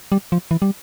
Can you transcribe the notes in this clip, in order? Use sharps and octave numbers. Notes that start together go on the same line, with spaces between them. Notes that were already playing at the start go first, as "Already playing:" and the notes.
G3
F3
E3
G3